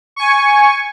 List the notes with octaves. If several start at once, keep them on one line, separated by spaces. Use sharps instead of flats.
G#5 C#6